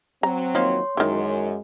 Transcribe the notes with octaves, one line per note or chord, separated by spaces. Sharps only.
F#3 C4 A#5
D#3 F3 A#3 C#5 C6
F#2 D#3 E3 G#3